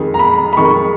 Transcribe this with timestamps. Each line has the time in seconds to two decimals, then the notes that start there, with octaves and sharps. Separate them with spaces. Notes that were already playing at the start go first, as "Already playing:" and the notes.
Already playing: F2 D#3 G#3
0.14 A#5
0.19 B5
0.53 B5
0.57 F2 D#3 G#3 C#6